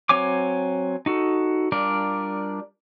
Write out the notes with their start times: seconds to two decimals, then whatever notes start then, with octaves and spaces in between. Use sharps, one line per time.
0.09 F#3 C4 C#5 G#5 D6
1.06 D#4 F#4 A4
1.72 G3 D4 F4 A#4 D5